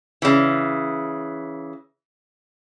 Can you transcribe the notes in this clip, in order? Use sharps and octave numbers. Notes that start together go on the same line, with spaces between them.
C#3 E3